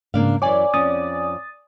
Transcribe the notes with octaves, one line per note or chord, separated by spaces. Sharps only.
G#2 C#3 A#3 D4 F5
F#2 E3 C#5 D5 G#5 D6
F2 C#4 D#6 A6